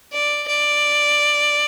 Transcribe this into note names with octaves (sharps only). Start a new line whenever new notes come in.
D5
D5